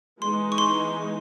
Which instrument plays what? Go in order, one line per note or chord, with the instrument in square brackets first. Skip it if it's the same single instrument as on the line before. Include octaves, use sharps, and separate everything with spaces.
[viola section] E3 G#3 B3 D#4 [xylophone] C6
[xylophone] C#6
C6